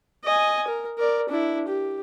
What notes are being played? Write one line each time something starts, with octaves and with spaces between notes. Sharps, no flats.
D#5 G#5
A#4
A#4 D5
D4 E4
G4